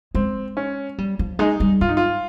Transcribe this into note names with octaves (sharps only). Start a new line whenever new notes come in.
G#3 C4
C#4
G3
F3
G#3 D#4
G3
G#2 F4
D#4
F4